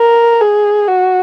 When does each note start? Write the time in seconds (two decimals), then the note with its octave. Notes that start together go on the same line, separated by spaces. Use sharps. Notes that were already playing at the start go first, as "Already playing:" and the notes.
Already playing: A#4
0.41 G#4
0.88 F#4